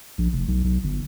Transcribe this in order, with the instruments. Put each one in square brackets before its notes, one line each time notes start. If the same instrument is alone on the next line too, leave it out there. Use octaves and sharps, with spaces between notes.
[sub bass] A#1
F1
B1
B1
G1